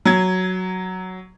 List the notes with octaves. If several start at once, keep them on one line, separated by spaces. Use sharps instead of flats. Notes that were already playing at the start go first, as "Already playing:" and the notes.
F#3 G#6